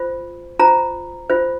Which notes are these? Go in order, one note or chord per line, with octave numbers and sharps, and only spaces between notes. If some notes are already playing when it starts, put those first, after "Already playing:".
Already playing: F4 C5
F4 C5 A#5
F4 C5